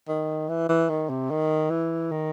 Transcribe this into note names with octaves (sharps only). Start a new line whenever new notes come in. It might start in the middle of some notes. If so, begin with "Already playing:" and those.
D#3
E3
E3
D#3
C3
D#3
E3
D#3